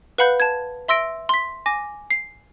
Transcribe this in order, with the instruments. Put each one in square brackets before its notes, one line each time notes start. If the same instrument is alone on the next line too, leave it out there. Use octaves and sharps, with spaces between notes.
[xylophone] B4 F5 F#5 B5 F#6 G6
A5 G#6
E5 C6 E6 A#6 D7
C6 B6
G#5 D6 A#6
C7